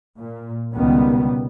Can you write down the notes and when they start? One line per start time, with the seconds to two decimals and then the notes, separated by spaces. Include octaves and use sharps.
0.18 A#2
0.74 C#2 B2 D#3 G3 B3